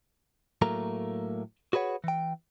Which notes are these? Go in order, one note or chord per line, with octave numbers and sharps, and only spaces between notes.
A2 F#3 A3 A#3 A#5
F#4 G#4 B4 C#5 F#5
E3 G5